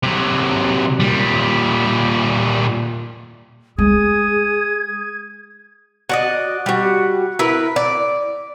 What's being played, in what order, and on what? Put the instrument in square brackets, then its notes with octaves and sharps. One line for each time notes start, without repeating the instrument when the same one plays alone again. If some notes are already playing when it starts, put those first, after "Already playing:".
[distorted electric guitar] C3 F#3
A#2 G3
[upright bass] G#3 [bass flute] G#4 [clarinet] D#6 [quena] G#6
[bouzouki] F#4 D5 D#5
G3 F#4
E4 A#4 B4
D5